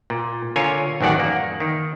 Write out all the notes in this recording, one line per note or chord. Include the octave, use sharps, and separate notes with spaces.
A#2
D3 F4 A#4 C#5 G#5
A1 F#2 D#3 D5 F#5
A#3
D#3